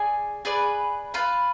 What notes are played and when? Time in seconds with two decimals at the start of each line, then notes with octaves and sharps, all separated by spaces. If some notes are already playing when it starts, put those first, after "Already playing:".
Already playing: G#4 D5 G#5
0.45 G#4 B4 D5
1.14 F4 B4 F5